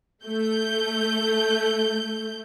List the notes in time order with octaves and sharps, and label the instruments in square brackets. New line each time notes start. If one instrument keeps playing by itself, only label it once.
[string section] A3 G6